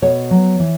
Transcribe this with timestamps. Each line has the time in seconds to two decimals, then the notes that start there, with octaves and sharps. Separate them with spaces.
0.02 B2 C#5
0.31 F#3 B3
0.59 E3